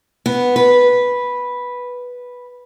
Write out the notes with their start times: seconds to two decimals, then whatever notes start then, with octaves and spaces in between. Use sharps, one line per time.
0.26 B3
0.56 B4